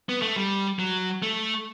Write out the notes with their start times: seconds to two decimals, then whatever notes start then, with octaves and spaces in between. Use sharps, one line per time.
0.09 B3
0.22 A3
0.36 G3
0.79 F#3
1.23 A3